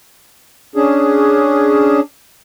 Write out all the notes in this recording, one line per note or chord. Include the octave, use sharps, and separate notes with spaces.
C#4 D4 G#4